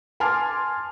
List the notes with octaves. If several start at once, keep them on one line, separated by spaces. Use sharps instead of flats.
G#5 A5 C6 D6 F6